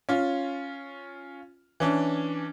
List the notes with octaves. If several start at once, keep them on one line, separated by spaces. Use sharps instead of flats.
C#4 F4
E3 C#4 D4